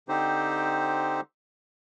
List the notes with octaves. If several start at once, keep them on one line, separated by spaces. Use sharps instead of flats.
D3 C4 D#4 G4 C5